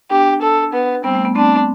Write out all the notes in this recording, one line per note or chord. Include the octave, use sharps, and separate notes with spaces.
B3 D4 G4
A4
B3
G3 B3 C4
A3
B3
A3 C4 D4